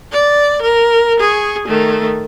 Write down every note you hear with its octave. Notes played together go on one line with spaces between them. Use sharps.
D5
A#4
G#4 C#6
D#3 A3